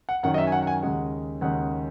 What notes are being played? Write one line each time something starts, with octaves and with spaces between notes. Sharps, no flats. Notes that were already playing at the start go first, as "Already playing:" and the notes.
F#5
F#2 D#3 F#3 F#5
D#5
E5
G#5
F#5
F#5
G#5
D#2 C#3 G#3 F#5
D#2 C#3 G#3 F#5